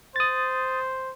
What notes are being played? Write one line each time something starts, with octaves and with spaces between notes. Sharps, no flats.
C5 D#6 A6